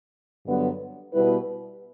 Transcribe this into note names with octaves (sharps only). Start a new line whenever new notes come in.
G2 D3 F#3 B3
B2 G3 B3 E4 B4